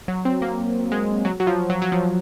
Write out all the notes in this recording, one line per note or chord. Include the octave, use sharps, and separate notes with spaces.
F#3
C4
A#3
G#3
F#3
F#3
F3
F#3
F#3
F3